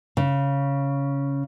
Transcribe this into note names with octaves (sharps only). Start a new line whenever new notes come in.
C#3